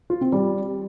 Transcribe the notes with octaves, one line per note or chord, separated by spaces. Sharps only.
F4
C4
G3